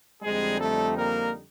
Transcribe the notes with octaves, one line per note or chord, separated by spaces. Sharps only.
F2 D3 G3 G#3 C4 D#4 G#4
A3 A4
A#3 A#4